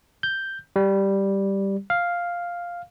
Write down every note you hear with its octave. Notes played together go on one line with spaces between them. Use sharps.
G6
G3
F5